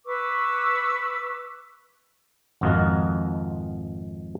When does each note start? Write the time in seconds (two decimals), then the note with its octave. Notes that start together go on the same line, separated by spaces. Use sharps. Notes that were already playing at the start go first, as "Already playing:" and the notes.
0.06 B4 C#6 D6 E6
2.61 G#1 F2 F4 F#4 A#4 D#5